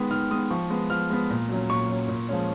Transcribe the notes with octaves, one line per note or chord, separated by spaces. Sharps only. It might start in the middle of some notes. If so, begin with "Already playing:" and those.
Already playing: D#3 G#3 B3
D#3 F6
G#3 B3 D#6
F3 C#6
G#3 B3
F3 F6
G#3 B3
A#2
F#3 C#4
A#2 C#6
F#3 C#4
A#2
F3 G#3 C#4